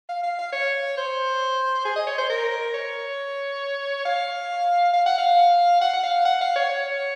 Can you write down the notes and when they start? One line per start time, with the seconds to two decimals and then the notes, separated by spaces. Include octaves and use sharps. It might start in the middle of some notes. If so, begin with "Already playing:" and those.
0.09 F5
0.24 F5
0.39 F5
0.53 C#5
0.98 C5
1.85 G#4
1.96 D#5
2.07 C#5
2.18 C5
2.30 A#4
2.74 C#5
4.06 F5
4.94 F5
5.06 F#5
5.18 F5
5.82 F#5
5.94 F#5
6.03 F5
6.25 F#5
6.41 F5
6.56 C#5
6.70 C#5